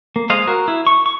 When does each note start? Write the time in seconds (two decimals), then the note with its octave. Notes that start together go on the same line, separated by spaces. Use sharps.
0.16 A#3
0.30 G#3 C5 D#5 F5
0.47 F#4 A#4
0.68 E4
0.87 C#6
1.06 C#6